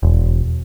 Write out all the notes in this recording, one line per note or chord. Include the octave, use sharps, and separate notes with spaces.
E1